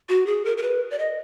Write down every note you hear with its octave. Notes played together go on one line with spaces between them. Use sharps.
F#4
G#4
A#4
A#4
B4
D5
D#5